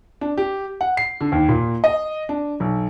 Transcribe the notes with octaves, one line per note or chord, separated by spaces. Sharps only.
D4
G4
F#5
C7
D3
D#2
A#2
D#5
D4
B1